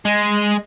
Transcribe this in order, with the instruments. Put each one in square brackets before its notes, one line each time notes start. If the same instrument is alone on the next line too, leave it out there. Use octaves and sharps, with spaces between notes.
[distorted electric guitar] G#3